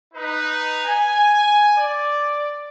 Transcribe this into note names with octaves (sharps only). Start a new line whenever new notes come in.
D#4 B4
G#5
D5